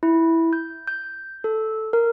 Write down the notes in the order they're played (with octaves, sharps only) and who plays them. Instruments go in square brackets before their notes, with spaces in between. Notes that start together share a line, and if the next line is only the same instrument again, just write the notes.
[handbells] E4
G6
G6
A4
A#4